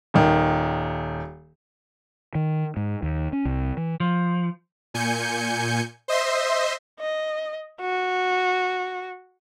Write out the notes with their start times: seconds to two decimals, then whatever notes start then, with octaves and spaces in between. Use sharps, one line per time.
0.14 D#1 D#3
2.35 D#3
2.77 G#2
3.03 D#2
3.33 C#4
3.45 C2
3.77 E3
4.00 F3
4.94 A#2 G#5 G6 C#7
6.08 C5 D#5 E5 C6
7.00 D#5
7.81 F#4